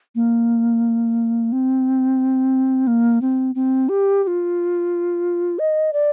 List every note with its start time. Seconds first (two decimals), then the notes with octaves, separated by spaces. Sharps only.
0.15 A#3
1.52 C4
2.87 A#3
3.22 C4
3.55 C4
3.89 G4
4.23 G4
4.27 F4
5.59 D#5
5.93 D5